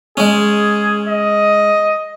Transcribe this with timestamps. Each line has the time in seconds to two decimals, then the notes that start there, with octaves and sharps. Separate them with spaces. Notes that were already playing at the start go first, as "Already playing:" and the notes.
0.17 G#3 C#4 G#4
1.07 D#5